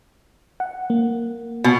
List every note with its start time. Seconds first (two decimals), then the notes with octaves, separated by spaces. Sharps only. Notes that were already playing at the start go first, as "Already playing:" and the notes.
0.60 F#5
0.90 A#3
1.64 B2